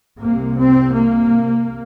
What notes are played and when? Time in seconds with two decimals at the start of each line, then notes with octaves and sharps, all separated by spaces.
0.19 C2 C3 A#3
0.57 C4
0.95 A#3